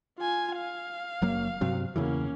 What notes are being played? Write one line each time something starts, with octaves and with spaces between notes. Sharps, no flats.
F4 G#5
F5
F#1 F#3 A#3
G2 C3 F#3
E2 C#3 E3 A#3 C#4